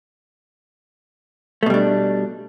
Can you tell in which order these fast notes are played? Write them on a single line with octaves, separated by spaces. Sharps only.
A3 B2 G3 D4